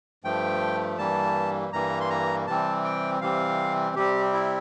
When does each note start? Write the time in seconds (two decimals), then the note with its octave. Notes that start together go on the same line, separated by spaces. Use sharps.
0.24 G2 F3 A3 G5
0.98 G2 E3 G3 A#3 A5
1.72 G2 E3 G3 A#3 A#5
2.01 C6
2.10 A#5
2.47 C3 E3 G3 C4 A5
2.84 G5
3.21 C3 E3 G3 C4 F5
3.96 C3 G3 C4 G4
4.33 E4